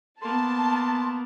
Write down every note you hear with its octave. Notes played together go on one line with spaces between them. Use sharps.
A#3 B3 A5 C6